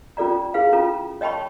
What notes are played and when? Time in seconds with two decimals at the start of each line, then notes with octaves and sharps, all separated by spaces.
0.17 C#4 F4 A4 D5 A#5
0.54 E4 G#4 B4 F5
0.73 C#4 F4 A4 A#5
1.21 C#5 D#5 G5 A5 B5 C#6